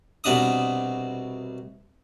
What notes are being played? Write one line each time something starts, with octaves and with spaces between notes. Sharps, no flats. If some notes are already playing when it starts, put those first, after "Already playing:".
C2 B2 D4 D#6